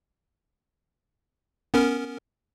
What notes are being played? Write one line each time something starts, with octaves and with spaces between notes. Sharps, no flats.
B3 C#4 A#4